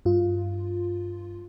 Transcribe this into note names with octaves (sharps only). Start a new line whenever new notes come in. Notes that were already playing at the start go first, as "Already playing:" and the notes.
G2 F4